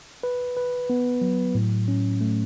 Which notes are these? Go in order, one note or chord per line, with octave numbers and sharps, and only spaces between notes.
B4
B4
B3
F#3
A2
C#4
A3